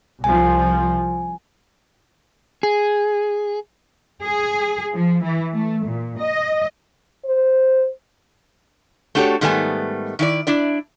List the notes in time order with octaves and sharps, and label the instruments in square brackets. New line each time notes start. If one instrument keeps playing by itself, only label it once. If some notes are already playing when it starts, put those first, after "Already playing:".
[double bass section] C2 F3 [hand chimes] G#5
[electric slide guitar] G#4
[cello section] G#4
F3
E3
A3
A#2
D#5
[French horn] C5
[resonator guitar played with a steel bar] A3 D4 F#4 G4 A4 C#5
G#2 D#3 G3 A3 B3 G#5
D#3 E4 D5
D4 E4 D5